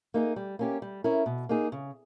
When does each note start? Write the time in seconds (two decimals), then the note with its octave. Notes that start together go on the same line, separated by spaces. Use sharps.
0.14 A#3 D#4 G#4
0.36 G3
0.59 A#3 C#4 G4
0.82 G3
1.04 C#4 E4 A#4
1.26 B2
1.49 A#3 D#4 G#4
1.72 C#3